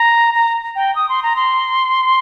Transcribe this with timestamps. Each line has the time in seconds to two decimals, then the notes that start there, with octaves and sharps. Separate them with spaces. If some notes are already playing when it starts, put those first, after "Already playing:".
Already playing: A#5
0.35 A#5
0.75 G5
0.95 D#6
1.09 C6
1.23 A#5
1.36 C6